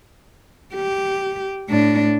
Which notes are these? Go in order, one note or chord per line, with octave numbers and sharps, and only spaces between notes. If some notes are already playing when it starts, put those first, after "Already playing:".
G4
A2 D4